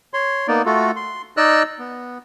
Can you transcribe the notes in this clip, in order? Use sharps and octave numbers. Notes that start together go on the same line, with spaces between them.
C#5 C6
A#3 B3 D#4 D5
A3 F4 F#4 A4
C6
D#4 D5 D#5 E6 F#6
B3